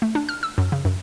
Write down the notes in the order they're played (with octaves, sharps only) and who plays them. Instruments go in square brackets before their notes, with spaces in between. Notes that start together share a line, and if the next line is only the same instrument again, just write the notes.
[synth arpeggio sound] A3
D4
F6
E6
F#2
C#3
F#2